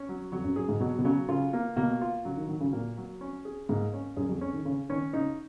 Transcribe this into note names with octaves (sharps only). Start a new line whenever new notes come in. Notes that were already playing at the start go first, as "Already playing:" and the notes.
Already playing: C#4
F#3
F2 F#3
F#2
F#2 G#4
G#2
B2 F#3
B2
C#3 F#3
C#3 F4
A#3
B2 A#3
F4
C#3 F#3
D#3
D#3 F#3
C#3
A#2 A#3
F#3
C#4
G#4
G#2 A#3
C#4
F#2 G#4
F2
C#4
D#3
C#3 C#4
D#3 C#4
C#3 D#4